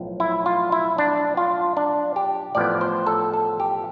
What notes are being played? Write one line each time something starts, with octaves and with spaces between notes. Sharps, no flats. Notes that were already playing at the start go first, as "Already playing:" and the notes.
Already playing: B1 A2 F3
E4
F4
E4
D4
F4
D4
G4
A1 A2 F3 B3 D5
C5
A4
A4
G4